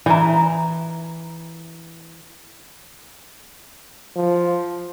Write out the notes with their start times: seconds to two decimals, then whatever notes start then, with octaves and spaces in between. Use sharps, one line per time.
0.06 E3 E5 A#5
4.16 F3